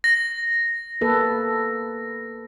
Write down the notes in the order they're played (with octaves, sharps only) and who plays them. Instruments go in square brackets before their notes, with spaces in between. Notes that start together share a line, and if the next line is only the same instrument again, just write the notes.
[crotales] A#6
[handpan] A#3 A4 B4